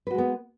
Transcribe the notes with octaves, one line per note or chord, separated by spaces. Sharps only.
G#3 B3 F#4 B4